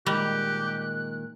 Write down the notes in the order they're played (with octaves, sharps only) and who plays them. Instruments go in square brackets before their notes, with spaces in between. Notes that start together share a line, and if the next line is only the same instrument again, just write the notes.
[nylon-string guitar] A#2 D#3 G#3 [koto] G3 [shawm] G4 [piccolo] F#6